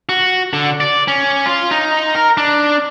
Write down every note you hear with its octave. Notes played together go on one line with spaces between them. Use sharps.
F#4
D3
D5
C#4
F4
D#4
A#4
D4